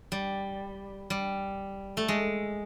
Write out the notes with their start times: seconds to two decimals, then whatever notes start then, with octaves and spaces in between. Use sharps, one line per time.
0.12 G3
1.10 G3
1.97 A3
2.08 G#3